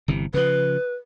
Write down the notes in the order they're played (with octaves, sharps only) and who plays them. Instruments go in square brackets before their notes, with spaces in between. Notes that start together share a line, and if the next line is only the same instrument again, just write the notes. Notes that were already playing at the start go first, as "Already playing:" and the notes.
[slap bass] G1 C3 E3
[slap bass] C#3 F3 [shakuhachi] B4